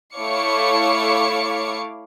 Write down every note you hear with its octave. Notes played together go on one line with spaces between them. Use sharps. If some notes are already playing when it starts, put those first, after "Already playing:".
A3 E4 C#5 F5 D6 C#7